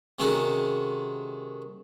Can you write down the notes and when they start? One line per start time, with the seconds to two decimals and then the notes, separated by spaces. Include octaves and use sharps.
0.19 C3 D#3 G#3 C#4 F#4 A4